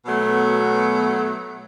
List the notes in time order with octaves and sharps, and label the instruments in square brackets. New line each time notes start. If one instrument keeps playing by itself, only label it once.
[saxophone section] B2 F#3 A3 B3